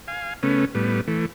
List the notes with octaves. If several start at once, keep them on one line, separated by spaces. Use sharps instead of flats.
F5 G#5
C#3 A3 B3 C#4
A2 G3 B3
E3 A3